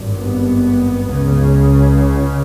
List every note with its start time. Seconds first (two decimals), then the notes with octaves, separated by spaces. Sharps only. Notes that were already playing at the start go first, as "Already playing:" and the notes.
Already playing: G#1 G2
0.19 B3
1.08 C#2 C#3